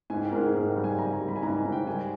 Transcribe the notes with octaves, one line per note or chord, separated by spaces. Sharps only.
G#2 G#5
G5
G#2 A#4
G#4
G#2 A#4
G5
G3
G#5
G3 A#5
A#5
G3
B5
G#5
G#2 A#5
G#5
G#2
G5
G3 G#5